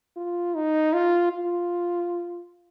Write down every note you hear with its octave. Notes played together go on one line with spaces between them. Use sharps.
F4
D#4
F4
F4